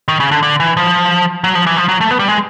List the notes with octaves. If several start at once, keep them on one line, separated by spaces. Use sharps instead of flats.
D#3
C#3
D3
D3
E3
F3
F#3
F3
E3
F3
F#3
A3
B3
G3
G#3